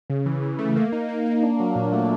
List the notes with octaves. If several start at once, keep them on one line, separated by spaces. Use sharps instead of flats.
C#3
E3
E3
A3
A#3
D#4
A#3
A#3
D4
F#3
A#2
A3